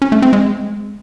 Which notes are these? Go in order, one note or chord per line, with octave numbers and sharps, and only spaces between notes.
C#4
A3
C4
G#3